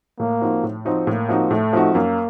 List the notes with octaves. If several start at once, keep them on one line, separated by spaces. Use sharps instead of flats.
A2 A#3
F3 C4 D#4 F#4
A2
F3 C4 D#4 F#4
A2 A#3
F3 C4 D#4 F#4
A2 A3
F3 C4 D#4 F#4
F#2 A#3